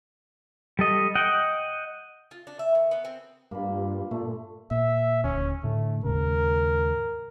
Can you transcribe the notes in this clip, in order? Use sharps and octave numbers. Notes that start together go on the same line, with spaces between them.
G3 A4 D#5
D#5 F#5 G5
F4
D4
E5
D#3
B3
C4
G2 A#3 F4 B5
A#2 A3
A#2 E5
D#1 D2 C#4
A2 D3 A3
D#2 G#2 C#3 A#4